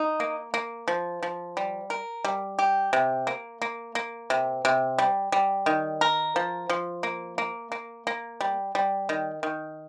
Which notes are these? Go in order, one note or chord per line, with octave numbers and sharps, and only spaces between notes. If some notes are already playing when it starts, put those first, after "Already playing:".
Already playing: D#4
A#3
A#3
F3
F3
G3
A#4
G3
G4
C3
A#3
A#3
A#3
C3
C3
G3
G3
D#3
A#4
F3
F3
A#3
A#3
A#3
A#3
G3
G3
D#3
D#3